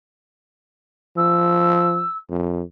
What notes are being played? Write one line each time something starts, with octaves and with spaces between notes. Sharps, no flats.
F3 E6
F2